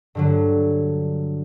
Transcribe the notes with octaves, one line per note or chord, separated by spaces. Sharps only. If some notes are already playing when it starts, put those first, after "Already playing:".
G2 D3 F#3